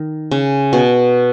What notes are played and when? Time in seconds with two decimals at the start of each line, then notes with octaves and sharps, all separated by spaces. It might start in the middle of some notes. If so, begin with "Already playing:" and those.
Already playing: D#3
0.31 C#3
0.73 B2